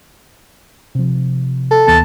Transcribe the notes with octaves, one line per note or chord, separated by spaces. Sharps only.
C3 F3
A4
D#2 E3 B3 A5